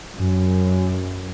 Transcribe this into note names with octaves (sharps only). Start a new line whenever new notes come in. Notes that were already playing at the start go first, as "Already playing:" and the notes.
F#2